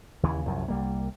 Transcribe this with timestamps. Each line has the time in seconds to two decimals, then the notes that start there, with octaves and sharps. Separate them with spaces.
0.23 D#2 C#3 E3
0.46 C2 F#2 F3
0.68 C2 G3 A#3